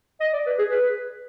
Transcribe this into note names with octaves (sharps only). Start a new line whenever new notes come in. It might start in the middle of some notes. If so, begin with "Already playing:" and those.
D#5
D5
B4
G#4
B4